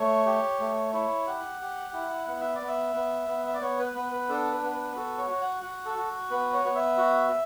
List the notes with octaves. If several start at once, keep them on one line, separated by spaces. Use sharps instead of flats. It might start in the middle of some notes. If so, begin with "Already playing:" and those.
Already playing: A3 C#5
G4
A3
E4 C#5
G4 F#5
G4
E4
B3 F#5
E5
D5
B3
E5
B3
B3
E5
D5
B3 C#5
B4
B3 B4
B4
D4 A4
B4
B3
B4
B4
F#4 A4
C#5
F#4
F#5
F#4 F#5
A4
F#4
B3 B4
C#5
B3
E5
F#4